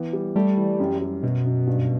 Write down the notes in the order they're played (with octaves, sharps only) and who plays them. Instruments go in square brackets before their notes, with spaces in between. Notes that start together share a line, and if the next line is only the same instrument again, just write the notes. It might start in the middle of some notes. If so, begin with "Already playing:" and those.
Already playing: [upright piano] E3 B3
G3
[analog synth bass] G3 [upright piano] A3
[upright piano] E3
F#2
G3
[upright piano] F#2 [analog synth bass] B2
[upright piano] F#2
G2